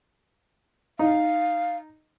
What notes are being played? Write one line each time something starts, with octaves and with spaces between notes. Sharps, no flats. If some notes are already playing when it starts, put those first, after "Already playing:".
D#4 F5